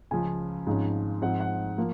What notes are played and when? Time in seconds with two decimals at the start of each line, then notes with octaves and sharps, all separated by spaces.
0.11 C#2 C#3 F3 G#5
0.67 G#1 G#2 F3 G#3 C#4
1.22 G#2 F3 C4 F#5
1.40 F#5
1.78 F3 A#3